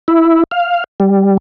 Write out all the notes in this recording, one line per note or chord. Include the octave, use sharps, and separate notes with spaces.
E4
F5
G3